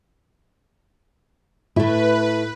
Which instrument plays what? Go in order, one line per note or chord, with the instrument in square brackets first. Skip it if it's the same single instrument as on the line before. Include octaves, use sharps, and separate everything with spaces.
[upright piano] A2 [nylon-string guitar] A3 E4 [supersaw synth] B4